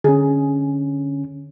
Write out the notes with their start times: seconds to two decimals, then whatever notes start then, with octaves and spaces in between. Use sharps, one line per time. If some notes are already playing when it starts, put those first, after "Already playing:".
0.04 D3 C#4 G#4